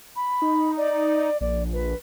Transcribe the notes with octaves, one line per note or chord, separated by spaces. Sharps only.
B5
D#4
D5
A#1 D5
B4